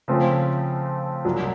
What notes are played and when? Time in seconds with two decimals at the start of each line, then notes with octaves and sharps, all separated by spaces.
0.08 C#3 F3 A3 C4
1.25 C2 A#2 F#3